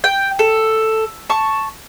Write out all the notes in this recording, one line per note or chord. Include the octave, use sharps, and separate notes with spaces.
G5
A4
A5 C#6